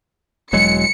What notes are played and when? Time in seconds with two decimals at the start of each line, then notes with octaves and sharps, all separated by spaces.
0.53 E1 F#3 G#3 C#7